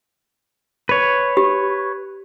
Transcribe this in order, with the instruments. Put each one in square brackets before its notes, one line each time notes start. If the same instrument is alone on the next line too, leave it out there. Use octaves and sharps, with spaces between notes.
[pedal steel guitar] B4 C#5
[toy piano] G4